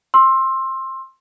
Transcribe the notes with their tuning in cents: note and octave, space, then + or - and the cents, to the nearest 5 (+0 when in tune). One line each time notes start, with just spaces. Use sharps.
C6 +20 E6 +5